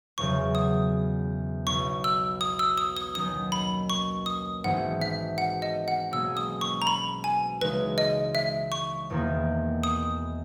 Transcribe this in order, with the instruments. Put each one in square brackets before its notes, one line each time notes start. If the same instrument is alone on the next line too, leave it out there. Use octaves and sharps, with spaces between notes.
[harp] E1 E2 C#3 F#3 [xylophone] C#6
[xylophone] D#6
[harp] B1 B2 F#3 B3 [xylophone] C#6
[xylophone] E6
D#6
E6
D#6
D#6
[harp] D#2 D#3 F#3 C#4 [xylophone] D#6
[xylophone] B5
C#6
D#6
[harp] G#1 G#2 E3 B3 F#4 [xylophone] F#5
[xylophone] E5
F#5
D#5
F#5
[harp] B1 B2 A#3 C#4 G#4 [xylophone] E6
[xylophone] D#6
C#6
A#5
B5
G#5
[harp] C#2 C#3 E3 G#3 D#4 [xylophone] B4
[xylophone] D#5
E5
C#6
[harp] E1 E2 D#3 A#3
[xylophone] D#6